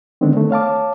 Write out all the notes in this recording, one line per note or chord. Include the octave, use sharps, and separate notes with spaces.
D3 D#3 G#3 B3 C4 D4
A3
C#5 F5 A5 D6